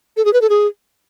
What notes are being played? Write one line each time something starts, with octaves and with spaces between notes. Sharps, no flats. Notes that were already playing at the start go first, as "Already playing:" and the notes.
A4
G#4
B4
A4
G#4